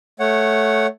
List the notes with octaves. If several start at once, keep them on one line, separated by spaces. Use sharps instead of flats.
A3 C#5 F#5